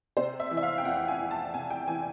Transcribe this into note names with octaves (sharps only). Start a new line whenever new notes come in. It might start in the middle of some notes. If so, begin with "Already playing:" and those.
C3 C5
E5
E3
E5
F5
G5
F2 F#5
G#5
F2
A5
C3 G#5
G5
E3 G#5